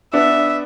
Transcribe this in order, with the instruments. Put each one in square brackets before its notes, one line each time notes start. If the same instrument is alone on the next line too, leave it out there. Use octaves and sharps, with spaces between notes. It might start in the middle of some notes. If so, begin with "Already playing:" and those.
[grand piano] B3 D4 [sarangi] E5